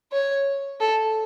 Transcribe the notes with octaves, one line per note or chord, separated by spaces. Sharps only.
C#5
A4